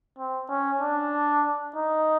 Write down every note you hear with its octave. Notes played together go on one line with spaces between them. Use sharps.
C4
C#4
D4
D#4